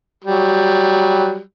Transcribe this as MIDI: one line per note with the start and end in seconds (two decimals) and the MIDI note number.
0.24 1.39 54
0.24 1.39 55